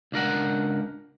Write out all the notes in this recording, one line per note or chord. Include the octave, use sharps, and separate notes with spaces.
C#2 D4 A#4 F#5